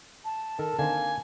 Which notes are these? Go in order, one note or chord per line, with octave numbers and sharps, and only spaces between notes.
A5
D#3 A4 A#4
D3 D#3 A#3 C4 G#5